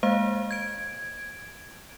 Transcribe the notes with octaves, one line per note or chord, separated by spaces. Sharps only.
G#3 A#3 C5 F5
G#6 D7